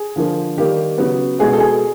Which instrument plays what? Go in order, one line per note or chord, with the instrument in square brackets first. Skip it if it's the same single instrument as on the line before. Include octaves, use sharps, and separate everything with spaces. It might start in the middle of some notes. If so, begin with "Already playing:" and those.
Already playing: [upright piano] G#4
D3 F3 A#3
D#3 G3 A#3 G4
C#3 F#3 B3
B2 G#3 B3 G#4
A4
G#4